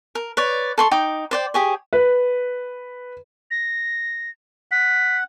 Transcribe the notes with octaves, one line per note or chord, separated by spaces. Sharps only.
A#4
B4 C#5 D5
A4 C6 C#6
D#4 G5 D6
C5 D5 G5
G4 G#4 C#5
B4
A#6
F#5 B6